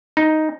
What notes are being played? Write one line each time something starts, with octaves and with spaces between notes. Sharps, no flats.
D#4